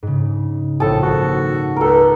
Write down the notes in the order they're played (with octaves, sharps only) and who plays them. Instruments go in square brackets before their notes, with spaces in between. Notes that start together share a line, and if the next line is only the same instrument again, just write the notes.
[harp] G#2 C#3
[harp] A#1 D#6 [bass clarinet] A2 [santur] A4 A5
[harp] G#1 [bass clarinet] F#4
[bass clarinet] C#2 [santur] A4 A#4